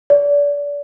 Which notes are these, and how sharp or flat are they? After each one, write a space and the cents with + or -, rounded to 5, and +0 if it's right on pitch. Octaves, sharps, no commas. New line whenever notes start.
D5 -30